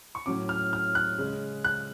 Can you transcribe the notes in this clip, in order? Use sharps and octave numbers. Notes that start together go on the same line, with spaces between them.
C#6
A2 F#3 C#4 D6
F6
F6
F#6
C#3 G#3 C#4
F#6